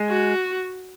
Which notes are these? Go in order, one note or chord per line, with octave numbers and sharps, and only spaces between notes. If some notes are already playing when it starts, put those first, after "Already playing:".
Already playing: G#3
F#4